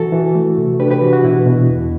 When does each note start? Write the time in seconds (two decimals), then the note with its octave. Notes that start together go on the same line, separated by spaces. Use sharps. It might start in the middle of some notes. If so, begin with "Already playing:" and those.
Already playing: E3 F#4 A4
0.12 E3
0.35 A3
0.57 C3
0.80 D4 G4 B4
0.91 G4 B4
1.02 E3 F#4
1.13 F#4
1.24 B2 E4
1.46 B2
1.69 E2